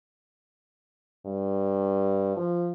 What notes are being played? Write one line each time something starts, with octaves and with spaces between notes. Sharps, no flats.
G2
F3